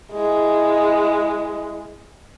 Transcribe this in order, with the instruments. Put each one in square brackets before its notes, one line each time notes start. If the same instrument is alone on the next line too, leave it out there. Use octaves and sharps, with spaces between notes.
[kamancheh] G#3 E4